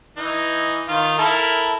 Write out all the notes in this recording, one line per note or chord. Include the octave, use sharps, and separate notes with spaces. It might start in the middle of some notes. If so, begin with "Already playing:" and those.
E3 D#4
D#3 F4
E4 A4 A#4